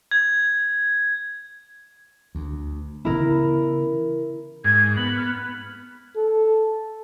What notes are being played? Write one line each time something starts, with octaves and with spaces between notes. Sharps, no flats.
G#6
D2
C#3 E3 B3 E4 A#4
G#2 G#6
B3 F#7
F6
A4